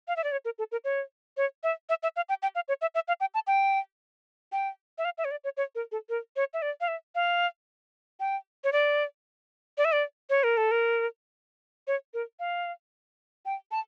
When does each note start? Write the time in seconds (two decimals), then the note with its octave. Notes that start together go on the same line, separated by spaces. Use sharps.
0.08 F5
0.16 E5
0.24 D5
0.32 C#5
0.45 A#4
0.59 A4
0.72 A#4
0.84 C#5
1.37 C#5
1.63 E5
1.89 E5
2.03 E5
2.16 F5
2.29 G5
2.43 G5
2.55 F5
2.68 C#5
2.82 E5
2.95 E5
3.08 F5
3.20 G5
3.34 A5
3.47 G5
4.52 G5
4.98 E5
5.05 F5
5.18 E5
5.25 C#5
5.31 D5
5.44 C#5
5.57 C#5
5.75 A#4
5.92 A4
6.09 A#4
6.36 C#5
6.54 E5
6.62 D5
6.81 F5
6.88 E5
7.15 F5
8.20 G5
8.64 C#5
8.73 D5
9.78 D5
9.85 E5
9.92 D5
10.30 C#5
10.44 A#4
10.57 A4
10.71 A#4
11.87 C#5
12.14 A#4
12.40 F5
13.46 G5
13.71 A5